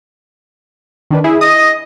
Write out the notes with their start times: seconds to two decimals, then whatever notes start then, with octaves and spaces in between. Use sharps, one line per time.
1.11 D#3 D4 B4
1.24 E4 G#4
1.41 D#5 D#6